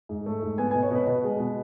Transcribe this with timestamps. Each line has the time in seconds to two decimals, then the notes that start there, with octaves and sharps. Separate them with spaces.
0.09 G#2
0.26 A3
0.42 G#2
0.58 B3 G#5
0.71 G#5
0.75 B2
0.83 C#5
0.91 B2 B4
1.07 B2
1.24 G#3
1.40 B2